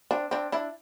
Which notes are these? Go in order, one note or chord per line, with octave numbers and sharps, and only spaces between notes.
C4 D4
C4 D4
D4 E4